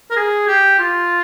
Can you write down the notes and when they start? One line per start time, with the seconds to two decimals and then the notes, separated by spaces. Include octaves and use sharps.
0.11 A#4
0.17 G#4
0.48 G4
0.79 F4